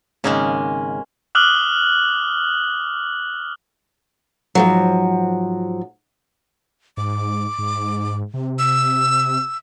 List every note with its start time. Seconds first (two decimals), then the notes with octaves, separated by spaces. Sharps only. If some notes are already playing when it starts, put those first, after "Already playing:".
0.24 G#1 C#3 G#3 A#3 C#4 D#4
1.35 D6 D#6 F6 F#6 F#7 G7
4.55 G#2 F3 F#3
6.97 G#2 D6
7.59 G#2
8.34 C3
8.59 E6